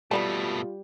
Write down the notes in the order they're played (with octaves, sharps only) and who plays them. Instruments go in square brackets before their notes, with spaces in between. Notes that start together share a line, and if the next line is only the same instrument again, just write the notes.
[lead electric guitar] B2 A3 [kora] G3 [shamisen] B3 D5 A5 [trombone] F4